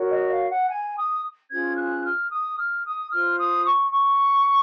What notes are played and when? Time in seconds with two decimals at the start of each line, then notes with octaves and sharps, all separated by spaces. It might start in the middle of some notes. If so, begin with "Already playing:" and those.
Already playing: F#4 A#4 C#5
0.10 D#5
0.30 F5
0.49 F#5
0.70 G#5
0.96 D#6
1.50 C#4 F4 G#4 C5 G#6
1.76 F#6
2.04 F6
2.30 D#6
2.58 F6
2.84 D#6
3.10 F4 C5 F6
3.38 D#6
3.64 C#6
3.91 C#6